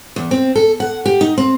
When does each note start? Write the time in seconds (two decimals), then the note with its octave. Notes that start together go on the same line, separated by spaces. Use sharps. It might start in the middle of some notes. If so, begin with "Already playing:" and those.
0.16 E2
0.31 C4
0.56 A4
0.80 F#5
1.06 G4
1.21 D#4
1.38 C4